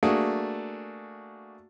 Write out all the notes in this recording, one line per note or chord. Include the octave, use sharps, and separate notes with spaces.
A3 A#3 D4 F#4 G#4